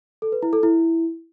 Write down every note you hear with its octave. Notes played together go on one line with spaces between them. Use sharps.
A4
B4
E4
A4
E4